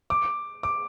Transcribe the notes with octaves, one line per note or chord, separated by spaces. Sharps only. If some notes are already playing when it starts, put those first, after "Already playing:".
D6
D6